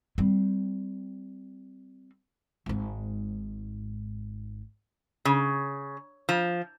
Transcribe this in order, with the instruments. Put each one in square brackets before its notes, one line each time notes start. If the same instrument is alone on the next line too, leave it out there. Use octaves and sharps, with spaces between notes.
[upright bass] G3 C4
G#1 G#2
[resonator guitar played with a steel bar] C#3
F3